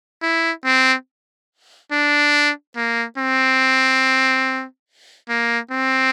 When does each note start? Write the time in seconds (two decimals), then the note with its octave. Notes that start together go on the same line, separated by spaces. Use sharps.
0.22 E4
0.65 C4
1.92 D4
2.76 A#3
3.18 C4
5.29 A#3
5.71 C4